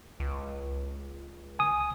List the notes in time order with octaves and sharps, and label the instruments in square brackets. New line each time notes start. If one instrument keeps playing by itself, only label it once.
[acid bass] C#2
[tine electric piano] G#5 D#6